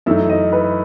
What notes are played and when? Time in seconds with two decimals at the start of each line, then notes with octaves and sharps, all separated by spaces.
0.06 F#2 E3 A3 D#4 E5
0.29 D#5
0.52 B4